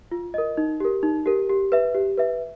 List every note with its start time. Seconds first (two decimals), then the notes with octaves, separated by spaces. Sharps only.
0.11 F4
0.34 A#4 D#5
0.57 D#4
0.80 G4 A#4
1.03 D#4
1.26 G4 A#4
1.50 G4
1.72 B4 E5
1.95 G4
2.18 B4 E5